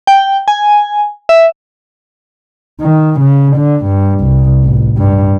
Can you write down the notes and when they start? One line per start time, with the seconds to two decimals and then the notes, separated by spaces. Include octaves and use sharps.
0.07 G5
0.48 G#5
1.29 E5
2.81 D#3
3.20 C#3
3.56 D3
3.86 G2
4.20 C2
4.63 A1
4.97 G2